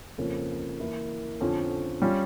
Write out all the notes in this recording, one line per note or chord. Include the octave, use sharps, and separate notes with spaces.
F2 C#3 F3 A#3 C#4
E3 A#3 E4 A#4
F2 D3 F3 C#4
G3 C#4 F4